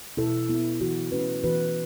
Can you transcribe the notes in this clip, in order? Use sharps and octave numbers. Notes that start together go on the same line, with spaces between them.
B2 E4 A4
B3 E4
E3 F#4
A3 C#4 F#4 B4
E3 F#4 B4